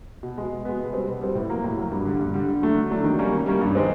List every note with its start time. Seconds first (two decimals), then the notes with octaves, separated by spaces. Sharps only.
0.23 B2
0.38 G#3 B3
0.52 B2
0.65 G#3 B3
0.80 B2
0.93 G3 C4
1.07 B2
1.21 G3 C4
1.35 A2
1.50 F#3 A#3
1.64 A2
1.78 F#3 A#3
1.92 G2
2.05 D3 G3
2.20 G2
2.34 D3 G3
2.48 D3
2.62 F#3 A3 D4
2.76 D3
2.91 F#3 A3 D4
3.04 D#3
3.19 G3 A#3 C#4
3.32 D#3
3.46 G3 A#3 C#4
3.61 G2
3.75 D#3 G#3 C4